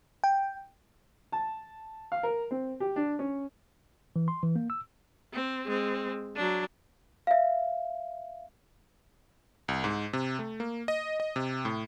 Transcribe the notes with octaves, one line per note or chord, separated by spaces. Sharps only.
G5
A5
F5
A#4
C4
G4
D4
C#4
E3
C6
E3
A#3
E6
C4
G#3 C4
F#3 D4
E5 F5
C2
G#2
C3
A3
A#3
D#5
D#5
C3
A2